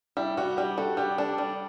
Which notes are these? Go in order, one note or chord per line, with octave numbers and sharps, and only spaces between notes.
G3 E4
G3 F#4
G3 G4
F#4 A4
G3 G4
D4 A4
G3